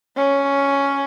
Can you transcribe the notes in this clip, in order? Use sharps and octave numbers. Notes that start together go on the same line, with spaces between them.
C#4